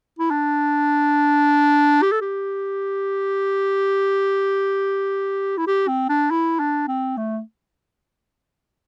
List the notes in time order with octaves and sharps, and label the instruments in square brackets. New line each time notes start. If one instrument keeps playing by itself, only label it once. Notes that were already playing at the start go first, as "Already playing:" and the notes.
[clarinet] E4
D4
G4
A4
G4
E4
G4
C4
D4
E4
D4
C4
A3